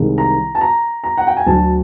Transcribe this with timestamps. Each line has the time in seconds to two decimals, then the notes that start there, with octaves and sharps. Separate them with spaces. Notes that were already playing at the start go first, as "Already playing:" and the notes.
Already playing: C2 C3 D#3 G#3
0.18 A#5
0.55 A5
0.61 A#5
1.04 A#5
1.17 F#5
1.27 G5
1.37 G#5
1.46 D2 D3 F#3 A5